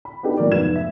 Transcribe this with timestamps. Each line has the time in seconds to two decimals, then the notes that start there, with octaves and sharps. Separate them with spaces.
0.05 B5
0.23 B3 D4 D#4 F#4 G4 A4
0.37 A2 F#3 A#4 D5
0.51 F1 G#2 F3 B3 G#6 E7
0.76 E5